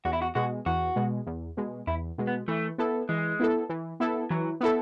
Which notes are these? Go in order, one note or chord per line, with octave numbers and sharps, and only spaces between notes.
E2 F#4
E4
F#4
B2 G#3 F#4
E2 F#4
B2 G#3
E2
B2 G#3
E2 E4
B2 G#3
B3
E3 A3
B3 E4 A4
E3 G#3
B3 E4 A4
E3
B3 E4 A4
E3 F#3
B3 E4 A4